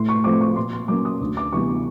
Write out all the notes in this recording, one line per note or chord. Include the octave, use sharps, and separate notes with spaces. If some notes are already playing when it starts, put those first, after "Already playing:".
Already playing: A2 C6
C#6
F3 A3 C4 D6
C#6
A#2 C6
C6
F#3 A#3 C#4 D6
D#6
D2
D6
C3 E3 G3 B3 C#6